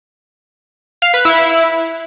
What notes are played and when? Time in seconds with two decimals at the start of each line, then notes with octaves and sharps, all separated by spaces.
1.02 F5
1.14 B4
1.25 E4